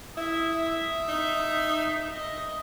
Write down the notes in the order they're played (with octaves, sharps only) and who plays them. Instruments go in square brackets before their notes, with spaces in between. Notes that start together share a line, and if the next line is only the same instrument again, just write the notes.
[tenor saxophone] E4 [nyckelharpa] E5 D#6
[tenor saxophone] D#4
[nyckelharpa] D#5